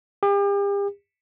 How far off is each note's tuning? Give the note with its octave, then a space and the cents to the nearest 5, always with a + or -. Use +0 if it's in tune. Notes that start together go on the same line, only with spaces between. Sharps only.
G4 +40